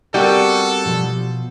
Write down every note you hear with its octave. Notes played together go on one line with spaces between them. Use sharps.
G3 B3 C4 F#4 A4 A#4
B2 F3 C5